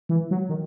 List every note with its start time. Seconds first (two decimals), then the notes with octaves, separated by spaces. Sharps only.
0.09 E3
0.31 F#3
0.49 D#3